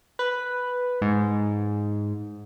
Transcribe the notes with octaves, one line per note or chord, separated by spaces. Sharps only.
B4
G#2